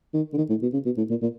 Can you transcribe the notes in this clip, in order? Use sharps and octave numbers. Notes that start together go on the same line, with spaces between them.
D#3
D3
D#3
A2
B2
C#3
B2
A2
A#2
A#2